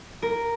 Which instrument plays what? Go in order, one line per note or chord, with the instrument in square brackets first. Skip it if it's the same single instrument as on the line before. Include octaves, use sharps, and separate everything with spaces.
[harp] A#4